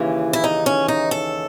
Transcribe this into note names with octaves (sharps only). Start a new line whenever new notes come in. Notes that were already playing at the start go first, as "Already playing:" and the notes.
Already playing: D#2 C#3 E3
E4
D#4
C#4
D#4
A4